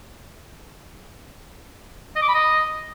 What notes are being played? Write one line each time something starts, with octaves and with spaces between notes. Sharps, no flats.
D#5
D6
B5
D#5